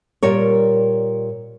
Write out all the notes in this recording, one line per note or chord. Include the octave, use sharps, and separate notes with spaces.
A#2 G3 A#4 C#5